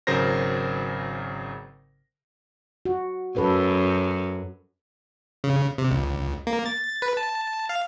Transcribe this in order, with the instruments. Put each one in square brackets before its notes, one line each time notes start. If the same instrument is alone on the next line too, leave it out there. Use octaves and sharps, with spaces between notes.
[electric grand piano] G#1 C#3 F#3 A#4 C5 A#6
[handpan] F#4
[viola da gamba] F#2 [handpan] A4 B4
[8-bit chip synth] C#3
C3
C#2
A#3
A6
B4
A5
F5